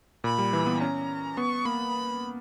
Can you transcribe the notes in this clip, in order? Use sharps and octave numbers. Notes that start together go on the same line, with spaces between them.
A#2 B5
G3
E3
B3
C#4 A#5
B3 C#6
A#3 B5